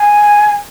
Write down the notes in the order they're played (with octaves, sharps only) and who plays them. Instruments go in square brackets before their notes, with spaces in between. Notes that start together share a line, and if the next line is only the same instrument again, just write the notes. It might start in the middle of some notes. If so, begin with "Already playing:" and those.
Already playing: [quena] G#5